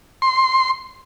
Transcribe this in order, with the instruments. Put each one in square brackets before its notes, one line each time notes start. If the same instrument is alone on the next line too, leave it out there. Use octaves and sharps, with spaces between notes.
[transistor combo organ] C6